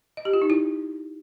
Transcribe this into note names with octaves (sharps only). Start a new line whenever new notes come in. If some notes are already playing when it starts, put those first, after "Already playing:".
D#5
G4
F4
D#4
E4